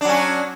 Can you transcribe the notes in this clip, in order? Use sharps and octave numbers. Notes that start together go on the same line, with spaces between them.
F#3 C#4 D4